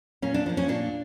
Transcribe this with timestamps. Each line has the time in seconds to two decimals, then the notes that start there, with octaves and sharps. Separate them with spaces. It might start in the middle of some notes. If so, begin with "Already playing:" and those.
0.22 A#2 C#4
0.34 D4
0.46 F3 A#3
0.57 C#4
0.68 A#2 D4